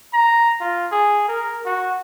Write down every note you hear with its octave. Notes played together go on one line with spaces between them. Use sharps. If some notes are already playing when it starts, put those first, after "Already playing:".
A#5
F4
G#4
A#4
F#4